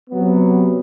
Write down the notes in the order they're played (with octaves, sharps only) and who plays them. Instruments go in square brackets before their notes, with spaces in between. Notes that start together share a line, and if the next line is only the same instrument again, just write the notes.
[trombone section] C3 F#3 B3